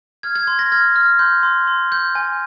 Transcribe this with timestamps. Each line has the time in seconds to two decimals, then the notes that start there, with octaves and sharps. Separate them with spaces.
0.23 F6 G#6
0.35 G#6
0.47 C6 G#6
0.59 A#6
0.72 F6 G#6
0.96 F6
1.19 C6 G6
1.43 C6
1.67 C6
1.92 G6
2.15 G#5